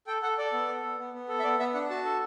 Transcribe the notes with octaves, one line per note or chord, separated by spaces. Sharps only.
A4 G5
A4 F#5
A4 D5
B3
A4
B3
B3
B3
A4
E5
B3 D5
B3 E5
D4 F#5
F#4 A5
A4